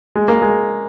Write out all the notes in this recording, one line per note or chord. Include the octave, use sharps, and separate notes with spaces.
G#3
A#3
G#3